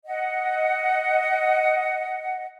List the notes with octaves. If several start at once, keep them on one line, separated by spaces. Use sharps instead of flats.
D#5 F#5